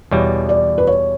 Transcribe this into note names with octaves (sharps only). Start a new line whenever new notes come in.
E2 B2 G3 C#5
D5
B4
C#5